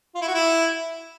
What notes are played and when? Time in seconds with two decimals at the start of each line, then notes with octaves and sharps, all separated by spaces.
0.15 F4
0.21 E4
0.28 F#4
0.34 E4